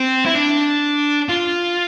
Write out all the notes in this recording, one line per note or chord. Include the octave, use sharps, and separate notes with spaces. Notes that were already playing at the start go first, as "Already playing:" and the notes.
Already playing: C4
E4
D4
F4